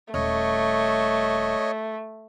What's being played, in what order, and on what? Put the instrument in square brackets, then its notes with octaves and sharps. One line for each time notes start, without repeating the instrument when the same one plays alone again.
[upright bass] D#1 G3 [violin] A3 [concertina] C#5 D#5